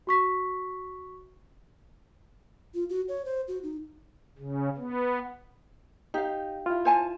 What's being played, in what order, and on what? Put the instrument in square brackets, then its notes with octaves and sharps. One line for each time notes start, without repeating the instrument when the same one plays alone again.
[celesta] F#4 C#6 B6
[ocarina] F4
F#4
C#5
C5
F#4
D#4
[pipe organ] C#3
B3
[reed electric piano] D#4 [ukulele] G4 F5
[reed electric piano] E4 F4
[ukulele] C5 G#5 A5